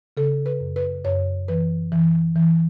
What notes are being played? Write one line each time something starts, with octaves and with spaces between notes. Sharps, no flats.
C#3 A4
B4
F#2
B4
F#2 C#5
E3 B4
E3
E3